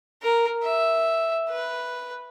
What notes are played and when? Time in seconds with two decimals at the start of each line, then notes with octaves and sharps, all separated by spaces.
0.22 A#4
0.63 E5
1.49 B4